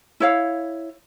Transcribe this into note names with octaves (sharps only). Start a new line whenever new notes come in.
E4 C#5 F5